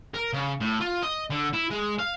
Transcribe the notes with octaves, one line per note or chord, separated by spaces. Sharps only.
A#4
C#3
A2
F4
D#5
D3
E4
G#3
F5